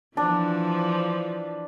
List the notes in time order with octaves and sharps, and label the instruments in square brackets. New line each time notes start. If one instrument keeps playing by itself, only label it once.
[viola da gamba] E3 F3 [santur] D4